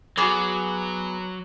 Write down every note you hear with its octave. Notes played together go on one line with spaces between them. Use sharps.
F#3 B3 F#4 G#4 D6